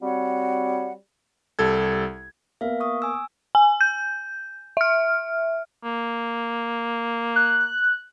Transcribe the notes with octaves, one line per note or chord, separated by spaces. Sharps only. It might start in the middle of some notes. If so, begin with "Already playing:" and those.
G3 C4 F#4 C#5 F#5
C2 G3 A4 G#6
A#3 B3 A#4 E5 F5
C#6 D#6
G#5 E6
G#5
G6
E5 F6
A#3
F#6